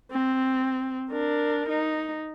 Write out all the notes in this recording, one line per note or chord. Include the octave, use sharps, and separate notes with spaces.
C4
D4 A#4
D#4